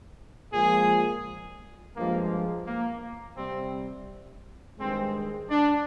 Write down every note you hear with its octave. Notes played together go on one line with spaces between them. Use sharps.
A#2 F3 G#3 G#4
G2 F3 G#3 A#3
A#3
C3 G3 C4
G2 D#3 G#3 C4
D4